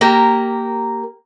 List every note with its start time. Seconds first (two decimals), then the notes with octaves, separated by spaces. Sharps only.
0.01 A#3 G4 A#4